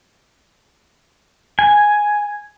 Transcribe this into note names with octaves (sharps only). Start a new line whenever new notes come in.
G#5